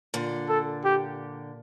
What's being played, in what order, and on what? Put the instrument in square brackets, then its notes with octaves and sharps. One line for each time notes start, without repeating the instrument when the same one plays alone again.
[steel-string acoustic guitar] A#2 D3
[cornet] A4
G4